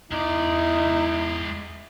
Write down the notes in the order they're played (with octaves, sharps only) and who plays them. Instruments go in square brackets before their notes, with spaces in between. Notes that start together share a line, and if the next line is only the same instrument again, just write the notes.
[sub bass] E2 [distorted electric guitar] G#3 D5 [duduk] D#4 [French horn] E4